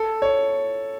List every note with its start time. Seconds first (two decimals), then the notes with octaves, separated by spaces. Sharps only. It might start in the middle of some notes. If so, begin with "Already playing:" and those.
Already playing: A4
0.22 C#5